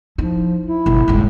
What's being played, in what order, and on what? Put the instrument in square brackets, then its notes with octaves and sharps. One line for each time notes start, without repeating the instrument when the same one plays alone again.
[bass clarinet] F3 [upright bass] D#4 E4
[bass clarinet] E4
[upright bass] G1 B2
D#1 G#2